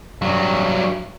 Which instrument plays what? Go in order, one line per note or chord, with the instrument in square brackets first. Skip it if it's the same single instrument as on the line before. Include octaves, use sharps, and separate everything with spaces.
[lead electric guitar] G2 F#3